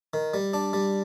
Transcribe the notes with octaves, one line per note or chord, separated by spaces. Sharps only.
D#3
G3
D4
G3